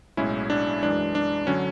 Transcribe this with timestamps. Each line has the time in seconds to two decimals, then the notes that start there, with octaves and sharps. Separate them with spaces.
0.17 B1 A2 G#3 C#4 E4
0.50 D4
0.82 F#2 E3 G#3 D4
1.15 D4
1.47 D3 F#3 C#4